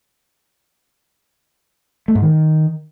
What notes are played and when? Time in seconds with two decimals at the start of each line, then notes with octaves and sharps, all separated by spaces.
2.08 A3
2.15 G#2
2.22 D#3